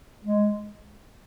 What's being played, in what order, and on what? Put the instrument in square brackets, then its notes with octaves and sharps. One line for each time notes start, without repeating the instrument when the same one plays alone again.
[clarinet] G#3